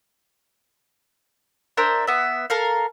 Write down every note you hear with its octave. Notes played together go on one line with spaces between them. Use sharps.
D4 A#4 C5 E5
B3 E5
A4 A#4 F5